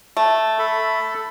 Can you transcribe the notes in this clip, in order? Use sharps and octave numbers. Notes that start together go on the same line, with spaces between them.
A3
A4 B5